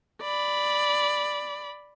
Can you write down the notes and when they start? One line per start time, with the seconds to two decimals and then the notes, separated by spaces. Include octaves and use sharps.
0.22 D5 B5